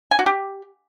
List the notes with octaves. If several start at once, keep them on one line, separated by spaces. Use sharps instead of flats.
G#5
F#4
G4